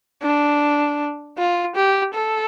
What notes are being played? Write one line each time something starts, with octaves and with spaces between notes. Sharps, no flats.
D4
F4
G4
A4